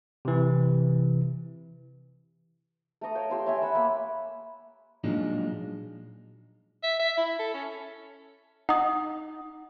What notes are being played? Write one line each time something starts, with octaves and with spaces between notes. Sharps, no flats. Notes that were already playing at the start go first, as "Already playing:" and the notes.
C3 E3
A3 A4 A#5 D#6
C#5 F5 G5
G4 C6 E6
C#5 E5 G#5 D6
F#5 G#5 B5 E6
A#3 E5 B5
A#2 F3 F#3 G#3 D4 D#4
E5
E5
E4
A4
C#4
D#4 F#5 D#6